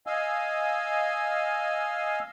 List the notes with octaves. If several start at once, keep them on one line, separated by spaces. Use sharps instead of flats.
D#5 F5 G#5 E6